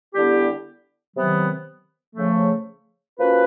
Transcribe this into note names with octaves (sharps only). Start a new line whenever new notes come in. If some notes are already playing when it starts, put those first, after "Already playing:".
D3 G3 B3 E4 G4
C3 D#3 F#3 B3
C#3 F3 A3
F3 A#3 C#4 F#4 B4